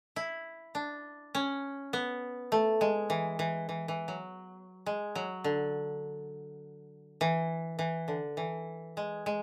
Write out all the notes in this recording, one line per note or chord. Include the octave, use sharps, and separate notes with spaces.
E4
D4
C#4
B3
A3
G#3
E3
E3
E3
E3
F#3
G#3
F#3
D3
E3
E3
D3
E3
G#3
G#3